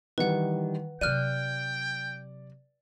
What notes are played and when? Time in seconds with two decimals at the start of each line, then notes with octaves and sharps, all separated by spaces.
0.18 D#3 E3 G3 B4 F#5
1.01 C3 F#3 D5 G5 F6 F#6 D#7